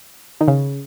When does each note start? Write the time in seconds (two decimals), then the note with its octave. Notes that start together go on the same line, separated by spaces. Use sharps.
0.41 D#3
0.48 C#3